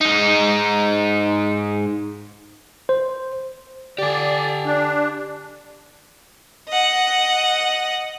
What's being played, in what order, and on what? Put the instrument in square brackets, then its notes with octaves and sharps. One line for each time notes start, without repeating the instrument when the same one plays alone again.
[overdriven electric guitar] G#2 D#4
[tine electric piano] C5
[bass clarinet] D3 [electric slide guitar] G4 G#5 [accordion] D5
[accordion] D4
[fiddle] D#5 F#5